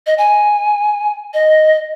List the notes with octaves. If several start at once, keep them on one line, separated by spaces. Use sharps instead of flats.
D#5
G#5
D#5